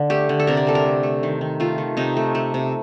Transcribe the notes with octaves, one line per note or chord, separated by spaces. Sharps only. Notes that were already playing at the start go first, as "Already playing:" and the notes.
Already playing: D3
A3 G4
D3
A4
C3 A#4
D5
A3 A4
A#4
A3
A3
D#3
D#3
A3 F4
D#3
C3 D#4
A3
A3
C3